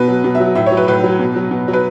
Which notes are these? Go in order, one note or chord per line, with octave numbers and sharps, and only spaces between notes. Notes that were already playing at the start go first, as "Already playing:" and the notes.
Already playing: B2 B4
F#3
B2
E5
F#3
A2 E5
C#5
F#3
B4
A2 B4
F#3
B2
F#3
B2
F#3
B4